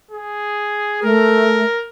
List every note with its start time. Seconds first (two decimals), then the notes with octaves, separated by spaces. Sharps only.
0.12 G#4
1.03 A3 A#4